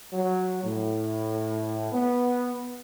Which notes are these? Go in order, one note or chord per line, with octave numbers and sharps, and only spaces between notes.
F#3
A2
B3